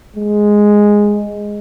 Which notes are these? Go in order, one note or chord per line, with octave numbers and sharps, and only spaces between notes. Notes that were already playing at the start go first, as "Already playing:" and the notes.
G#3